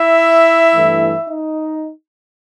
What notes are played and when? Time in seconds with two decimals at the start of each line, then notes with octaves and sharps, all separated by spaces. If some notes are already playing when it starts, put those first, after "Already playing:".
Already playing: E4 E5
0.74 G2 E3 A3
1.30 D#4 D#5